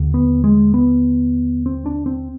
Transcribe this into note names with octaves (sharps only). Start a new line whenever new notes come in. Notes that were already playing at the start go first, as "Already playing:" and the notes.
Already playing: D#2 D3
B3
G#3
B3
C4
D4
C4